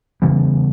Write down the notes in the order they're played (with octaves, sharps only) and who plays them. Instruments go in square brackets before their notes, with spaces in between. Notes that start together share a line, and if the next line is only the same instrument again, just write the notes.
[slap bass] C#3 E3 G3 B3